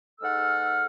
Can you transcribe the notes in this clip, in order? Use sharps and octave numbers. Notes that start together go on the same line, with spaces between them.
G#2 G#3 A4 F#5 E6 F6